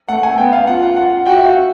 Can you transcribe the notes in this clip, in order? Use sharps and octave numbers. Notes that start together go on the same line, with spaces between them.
A3 F#5
G#5
B3 G5
F5
F4 F#5
F#5
F#5
F#4 G5
E5
F5